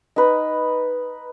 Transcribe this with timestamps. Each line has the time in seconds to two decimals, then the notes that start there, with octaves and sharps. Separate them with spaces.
0.16 D#4 B4